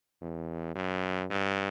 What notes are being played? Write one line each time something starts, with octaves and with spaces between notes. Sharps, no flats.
E2
F#2
G2